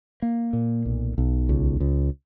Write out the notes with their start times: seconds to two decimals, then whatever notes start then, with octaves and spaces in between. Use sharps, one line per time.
0.22 A#3
0.53 A#2
0.85 B1
1.18 B1
1.49 C#2
1.80 C#2